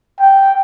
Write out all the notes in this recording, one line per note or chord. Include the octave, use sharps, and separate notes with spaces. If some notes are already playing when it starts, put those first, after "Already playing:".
G5